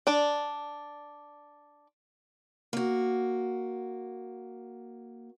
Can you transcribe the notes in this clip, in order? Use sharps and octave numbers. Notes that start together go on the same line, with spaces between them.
D4 D5
A#3 F#4